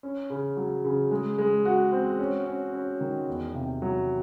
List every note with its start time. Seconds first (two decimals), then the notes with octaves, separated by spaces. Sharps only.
0.03 C#4
0.30 C#3
0.57 F#3
0.85 C#3
1.11 G#3
1.38 G#3
1.65 F#4
1.92 C4
2.19 C#4
2.46 C#4
2.74 C#4
3.01 D#3
3.28 E2
3.54 C3
3.82 F#3